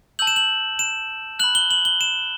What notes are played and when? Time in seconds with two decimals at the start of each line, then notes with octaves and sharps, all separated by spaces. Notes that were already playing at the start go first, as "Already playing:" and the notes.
0.19 A5 E6 G6 F#7
0.27 E7
0.36 F#7
0.79 E7
1.39 F#6 F#7
1.44 B5
1.55 G7
1.71 F#7
1.85 G7
2.01 E7